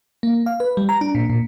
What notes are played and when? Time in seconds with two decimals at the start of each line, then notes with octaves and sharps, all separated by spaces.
0.23 A#3
0.46 F5
0.60 B4
0.77 G3
0.89 A#5
1.01 D4
1.15 A#2
1.30 A#2